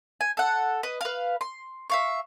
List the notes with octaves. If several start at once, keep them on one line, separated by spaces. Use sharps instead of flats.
G#5
A4 F#5
B4 D#5
B4 F5
C6
E5 F5 C#6